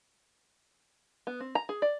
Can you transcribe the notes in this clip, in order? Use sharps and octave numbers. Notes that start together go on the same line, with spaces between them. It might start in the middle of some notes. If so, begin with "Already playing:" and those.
B3
C4
A#5
G#4
D5